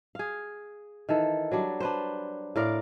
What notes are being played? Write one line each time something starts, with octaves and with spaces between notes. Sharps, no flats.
G#4 F5
D#3 E3 A4
F#3 G3 D4
D4 B4 C5
A2 A#4 D5 F5